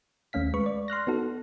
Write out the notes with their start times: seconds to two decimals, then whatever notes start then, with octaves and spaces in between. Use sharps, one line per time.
0.33 D#2 A3 C#4 F5 B6
0.54 G#3 B4 C#6
0.66 D5
0.88 C6 F6 F#6 A#6
1.07 B3 D#4 F#4 A4